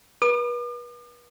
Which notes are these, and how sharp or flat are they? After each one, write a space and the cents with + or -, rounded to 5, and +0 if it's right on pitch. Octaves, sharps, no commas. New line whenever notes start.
B4 -40 D6 +45